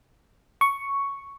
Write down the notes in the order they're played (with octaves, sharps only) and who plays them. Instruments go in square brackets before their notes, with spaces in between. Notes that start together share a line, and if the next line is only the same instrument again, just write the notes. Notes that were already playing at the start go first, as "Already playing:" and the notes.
[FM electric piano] C#6